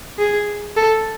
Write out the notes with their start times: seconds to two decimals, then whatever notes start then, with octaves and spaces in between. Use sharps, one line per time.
0.19 G#4
0.77 A4